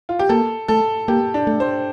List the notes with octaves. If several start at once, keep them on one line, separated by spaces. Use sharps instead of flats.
F4
G4
A#3 A4
A3 A4
A#3 G4
D4
A3
C5